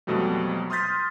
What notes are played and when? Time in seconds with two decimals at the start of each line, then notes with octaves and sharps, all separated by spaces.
0.07 F2 B2 F#3 G3 A3
0.70 C6 D#6 F6 G6 A6 B6